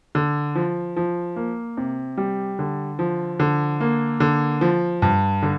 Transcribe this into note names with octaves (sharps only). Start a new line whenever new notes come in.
D3
F3
F3
A#3
C3
G3
D3
F3
D3
A#3
D3
F3
G2
D3